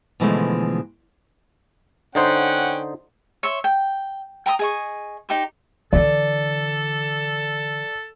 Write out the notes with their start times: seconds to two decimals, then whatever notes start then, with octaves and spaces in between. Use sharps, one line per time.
0.20 B2 D3 E3 F3 G#3 A3
2.15 D3 C#4 D#4 C5 F#5 G5
3.43 C#5 E5 C6
3.64 G5
4.46 G5 A#5 B5 D#6
4.59 G#4 D#5 C#6
5.29 D#4 G4 C5
5.93 D3 E3 A4 D5